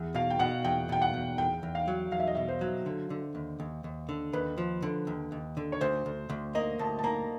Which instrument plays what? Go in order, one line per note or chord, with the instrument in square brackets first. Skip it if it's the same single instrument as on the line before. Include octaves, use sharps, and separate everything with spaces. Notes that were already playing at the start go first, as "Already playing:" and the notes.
Already playing: [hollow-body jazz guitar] E2
[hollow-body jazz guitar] B2 [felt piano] F5
[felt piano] G5
[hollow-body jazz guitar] B2 [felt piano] F#5
[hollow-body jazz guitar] E2 [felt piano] G5
[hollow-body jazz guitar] B2 [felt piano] G5
[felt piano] F#5
[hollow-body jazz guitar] E2
[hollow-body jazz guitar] E2 [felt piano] G5
[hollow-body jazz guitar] E2
[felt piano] F5
[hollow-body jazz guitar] F#3
[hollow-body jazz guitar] E2 [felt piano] F5
[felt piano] E5
D#5
[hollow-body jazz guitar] B2 [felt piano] E5
[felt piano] C5
[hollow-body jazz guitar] F#3
D3
D3
D#2
D#2
D#2
D3
[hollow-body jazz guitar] D#2 [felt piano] B4
[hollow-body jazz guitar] F3
D3
D#2
D#2
D3
[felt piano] C#5
[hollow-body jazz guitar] D2 [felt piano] C5
[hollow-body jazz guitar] D2
D2
[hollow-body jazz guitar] A#3 [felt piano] D#5
[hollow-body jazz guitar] D2 [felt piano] A5
[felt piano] A5
[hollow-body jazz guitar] A#3 [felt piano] A#5